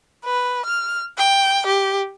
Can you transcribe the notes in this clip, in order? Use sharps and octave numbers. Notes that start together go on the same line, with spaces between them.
B4
F6
G5
G4